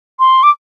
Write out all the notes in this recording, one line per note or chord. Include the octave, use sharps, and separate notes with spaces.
C6
D6